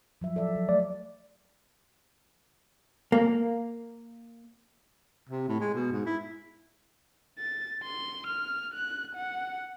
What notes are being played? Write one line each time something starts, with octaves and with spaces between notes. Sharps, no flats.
F3 F#3 E5
A4 D5 E5
F#3
A3 D5
A#3
C3
A2
G#3
B2
G#2
E4
A6
C6
F6
F#6
F#5